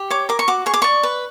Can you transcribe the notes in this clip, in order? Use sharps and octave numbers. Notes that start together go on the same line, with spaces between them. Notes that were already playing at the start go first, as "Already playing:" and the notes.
Already playing: G4
C#5 D6
A#4 D6
C#6
F#4 D6
G#4 C#6
D6
D5 C#6
B4